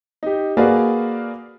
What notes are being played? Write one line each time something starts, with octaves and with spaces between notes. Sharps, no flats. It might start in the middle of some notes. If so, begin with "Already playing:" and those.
D#4 G4
A#3 F#4 G#4 B4 D5 F5